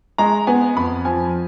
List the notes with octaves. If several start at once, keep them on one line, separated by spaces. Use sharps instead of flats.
G#3 A#5
B3 G#5
F2 B5
F3 G#5